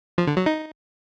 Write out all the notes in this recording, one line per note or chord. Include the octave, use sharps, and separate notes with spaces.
F3
D3
F#3
D#4